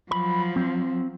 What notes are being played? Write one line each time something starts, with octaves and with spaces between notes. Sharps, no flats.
F3 F#3 B5
C4